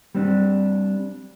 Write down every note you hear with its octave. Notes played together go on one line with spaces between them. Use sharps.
G3 C4 D4